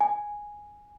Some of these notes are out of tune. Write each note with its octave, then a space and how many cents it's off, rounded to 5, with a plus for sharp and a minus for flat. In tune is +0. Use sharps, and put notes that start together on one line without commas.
G#5 +0